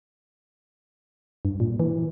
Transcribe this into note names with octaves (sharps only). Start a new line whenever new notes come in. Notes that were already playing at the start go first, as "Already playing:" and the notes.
G2
A#2
E3